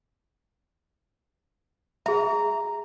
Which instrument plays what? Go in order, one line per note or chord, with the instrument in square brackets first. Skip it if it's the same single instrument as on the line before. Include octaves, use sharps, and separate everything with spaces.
[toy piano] G#4 E5 [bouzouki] A#5